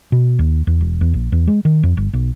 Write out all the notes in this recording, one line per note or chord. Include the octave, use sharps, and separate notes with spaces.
B2
D#2
E2
E1
E2
A#1
E2
G#3
D#3
F2
G1
B1